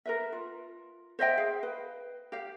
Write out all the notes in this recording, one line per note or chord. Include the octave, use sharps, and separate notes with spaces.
A#4 B4 E5
F4
C5 D#5 E5 G5
G#4 F5
B4
G4 F5